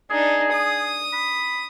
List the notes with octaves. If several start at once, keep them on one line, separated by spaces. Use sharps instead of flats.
D4 D#4 G#4
D#6
B5